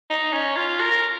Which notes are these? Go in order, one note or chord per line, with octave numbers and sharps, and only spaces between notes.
D#4
C#4
F4
A#4